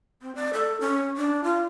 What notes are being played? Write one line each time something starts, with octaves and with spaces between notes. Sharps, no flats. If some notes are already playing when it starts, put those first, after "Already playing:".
C4
D5
A4
C#4
D4
F4